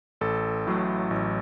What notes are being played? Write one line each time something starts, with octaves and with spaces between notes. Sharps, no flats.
A1 A4
A2 F#3 A3
A1